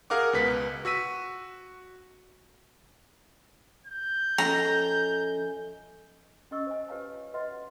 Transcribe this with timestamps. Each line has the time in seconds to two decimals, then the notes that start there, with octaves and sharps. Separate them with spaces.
0.10 G#4 A#4 F5 F#5 D6
0.33 C#2 B2 B4 B6
0.85 F#4 E6 B6 D#7
3.86 G6
4.38 F3 C#4 A4 D#5 E5 G#5 A#5
6.51 C#4 G4 D#5 C#6 E6
6.67 C5 D#5 G#5
6.89 F4 G4 B4 C#5 F5 A5
7.34 F#4 B4 D#5 E5 F#5 C6